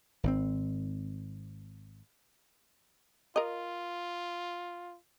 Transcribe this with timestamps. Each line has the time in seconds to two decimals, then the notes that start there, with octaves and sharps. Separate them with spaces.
0.23 G#1 C3 C4
3.36 F4 A#4 D#5